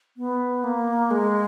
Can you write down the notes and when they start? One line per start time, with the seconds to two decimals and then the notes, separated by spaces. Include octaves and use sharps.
0.17 B3
0.64 A#3
1.11 G#3